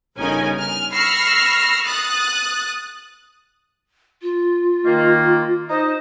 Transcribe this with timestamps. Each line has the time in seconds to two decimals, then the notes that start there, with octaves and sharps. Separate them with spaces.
0.17 G1 C#3 C#4 D#4 A#4 G#5
0.60 G#5 F6
0.93 B5 C#6 E6 F6 A#6 C7
1.86 D#6 F#6 A6
4.22 F4
4.86 D#3 A#3
5.70 D#4 C5 D#5